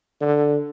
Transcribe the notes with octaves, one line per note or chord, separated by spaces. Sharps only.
D3